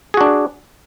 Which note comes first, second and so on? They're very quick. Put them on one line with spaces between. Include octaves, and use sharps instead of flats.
G#4 F#4 D4